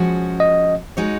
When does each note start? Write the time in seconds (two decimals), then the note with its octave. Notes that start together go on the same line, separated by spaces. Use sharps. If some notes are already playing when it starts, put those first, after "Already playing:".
Already playing: F3 G#3 C#4 F#4
0.40 D#5
0.97 G#3 D#4 F#4 C#5